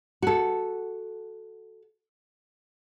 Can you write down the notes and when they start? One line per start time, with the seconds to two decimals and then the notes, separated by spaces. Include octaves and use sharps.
0.22 F#4 A4